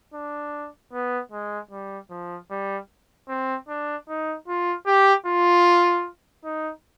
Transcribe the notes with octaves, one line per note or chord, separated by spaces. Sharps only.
D4
B3
G#3
G3
F3
G3
C4
D4
D#4
F4
G4
F4
D#4